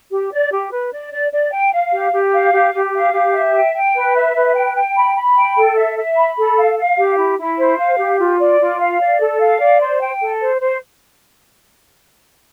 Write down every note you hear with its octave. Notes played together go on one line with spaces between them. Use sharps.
G4
D5
G4
B4
D5
D5
D5
G5
F5
G4
G4
F5
G4
G4
F5
G4
E5
G5
G5
B4
E5
B4
G5
G5
B5
B5
G5
A4
E5
E5
B5
A4
F5
F5
G4
E4
E4
C5
F5
G4
F4
D5
F4
F5
D5
A4
F5
D5
C5
G5
A4
C5
C5